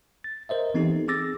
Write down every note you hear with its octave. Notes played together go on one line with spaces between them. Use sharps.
A6
A#4 C5 D#5 E5
E3 B3 C4 D#4 G4 A4
D#4
C4 G#4 D6 E6 A6 A#6